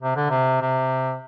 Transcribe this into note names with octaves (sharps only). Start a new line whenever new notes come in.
C3
D3
C3
C3